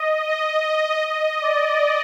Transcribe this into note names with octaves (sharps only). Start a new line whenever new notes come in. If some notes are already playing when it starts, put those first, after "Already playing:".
Already playing: D#5
D#5
D#5
D#5
D5